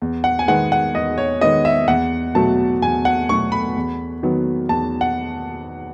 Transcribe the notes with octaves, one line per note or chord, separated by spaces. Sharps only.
E2
F#5
G#5
D#3 G#3 B3 F#5
F#5
E2 D#5
C#5
D#3 G#3 B3 D#5
E5
E2 F#5
B2 F#3 A3 A5
E2 G#5
F#5
B2 F#3 A3 C#6
B5
E2
D#3 F#3 B3
E2 A5
F#5